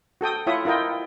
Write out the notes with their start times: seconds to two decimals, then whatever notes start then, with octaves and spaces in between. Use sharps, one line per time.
0.21 F#4 A4 G5 D#6
0.47 E4 F4 C#5 E5 F#5 D#6
0.65 E4 F4 A#4 D#5 G5